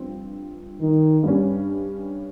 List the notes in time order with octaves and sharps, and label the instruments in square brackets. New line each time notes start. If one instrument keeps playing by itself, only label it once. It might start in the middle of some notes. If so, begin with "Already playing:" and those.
Already playing: [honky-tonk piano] G2 F3 C4
[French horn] D#3
[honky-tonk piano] G2 G3 C#4